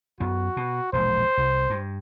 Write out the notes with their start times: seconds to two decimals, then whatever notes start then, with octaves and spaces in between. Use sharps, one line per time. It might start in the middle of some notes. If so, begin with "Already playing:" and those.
0.20 F#2 B3 F#4
0.57 B2
0.93 E1 A#1 G#3 C5
1.37 C2
1.70 G2